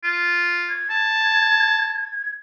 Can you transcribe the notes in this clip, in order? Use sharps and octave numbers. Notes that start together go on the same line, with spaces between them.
F4
G#6
A5